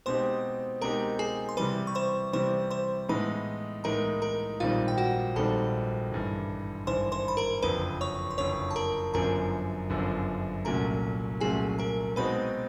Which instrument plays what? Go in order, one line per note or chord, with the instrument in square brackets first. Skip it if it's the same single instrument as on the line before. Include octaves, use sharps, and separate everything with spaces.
[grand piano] B2 G#3 C4 D#4 G4 [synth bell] C5 C6
[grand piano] B2 G#3 C4 D#4 G4 [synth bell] A#4 A#5
[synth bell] G#4 G#5
C6
[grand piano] C3 E3 G3 [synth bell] B4 B5
[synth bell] C#6
C5 C6
[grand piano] C3 E3 G3 [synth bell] C5 C6
[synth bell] C5 C6
[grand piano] A2 E3 G#3 B3 D#4 [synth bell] B4 B5
[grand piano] A2 E3 G#3 B3 D#4 [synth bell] A#4 A#5
[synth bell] A#4 A#5
[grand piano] A#1 G#2 D#3 G3 C4 [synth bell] F4 F5
[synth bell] G5
F#4 F#5
[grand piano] A#1 G#2 D#3 G3 C4 [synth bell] A4 A5
[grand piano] G#1 G2 E3
[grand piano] G#1 G2 E3 [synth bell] C5 C6
[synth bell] C5 C6
B5
A#4 A#5
[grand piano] F#1 F2 D3 [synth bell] B4 B5
[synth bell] C#5 C#6
C6
[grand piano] F#1 F2 D3 [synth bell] C#5 C#6
[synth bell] A5
A#4 A#5
[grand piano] G1 F#2 D3 F3 [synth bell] A#4 A#5
[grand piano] G1 F#2 D3 F3
[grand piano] C2 A#2 F#3 A3 C#4 [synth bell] A#4 A#5
[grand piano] C2 A#2 F#3 A3 C#4 [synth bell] G#4 G#5
[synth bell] A#4 A#5
[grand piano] B2 G#3 C4 D#4 F#4 [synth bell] B4 B5